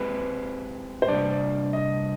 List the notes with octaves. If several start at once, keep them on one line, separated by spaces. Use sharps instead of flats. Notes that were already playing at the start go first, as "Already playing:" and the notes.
Already playing: G#3 C4 G4 B4
C5
C3 G3 D4 D5
D#5